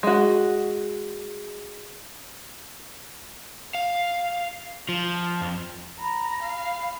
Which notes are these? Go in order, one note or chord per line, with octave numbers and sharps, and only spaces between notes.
G#3 F#4
F5
F3
F2
A#5 B5
F5